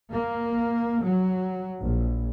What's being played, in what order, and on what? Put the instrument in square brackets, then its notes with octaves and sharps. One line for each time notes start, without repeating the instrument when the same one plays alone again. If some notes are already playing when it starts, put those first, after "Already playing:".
[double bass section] A#3
F#3
A#1